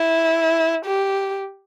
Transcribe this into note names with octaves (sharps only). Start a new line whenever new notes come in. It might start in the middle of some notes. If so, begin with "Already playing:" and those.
Already playing: E4
G4